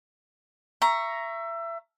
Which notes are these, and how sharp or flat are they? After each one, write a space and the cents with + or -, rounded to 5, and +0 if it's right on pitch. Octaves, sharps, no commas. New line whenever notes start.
E5 +25 A#5 +5 C#6 +0